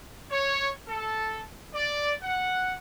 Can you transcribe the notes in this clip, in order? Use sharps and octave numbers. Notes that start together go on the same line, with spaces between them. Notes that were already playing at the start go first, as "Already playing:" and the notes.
C#5
A4
D5
F#5